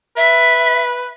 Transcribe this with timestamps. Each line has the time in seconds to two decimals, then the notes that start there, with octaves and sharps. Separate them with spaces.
0.17 B4 E5